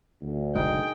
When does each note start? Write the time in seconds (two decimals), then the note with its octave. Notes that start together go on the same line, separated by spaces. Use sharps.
0.22 D2
0.55 F#1 B2 G#3 D#4 G#4 A#4 G5